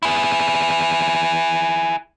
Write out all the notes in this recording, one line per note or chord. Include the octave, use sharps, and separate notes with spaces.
E4 G#4